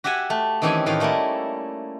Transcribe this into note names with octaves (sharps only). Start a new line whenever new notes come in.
F#4 G4 E5 F#5 G#5
A3
D#3 E3 C4 C#4 G4 G#5
A2 D#3 F4 B4 F5
G3 A3 A#3 C#4 E4